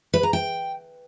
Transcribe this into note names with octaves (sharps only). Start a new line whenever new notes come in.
B4
A#5
G5